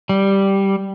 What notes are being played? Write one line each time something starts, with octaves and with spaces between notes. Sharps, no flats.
G3